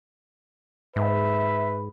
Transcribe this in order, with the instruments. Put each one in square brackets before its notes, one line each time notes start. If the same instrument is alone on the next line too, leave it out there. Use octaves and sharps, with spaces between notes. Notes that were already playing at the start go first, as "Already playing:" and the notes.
[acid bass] G#2 [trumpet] B4 [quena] E5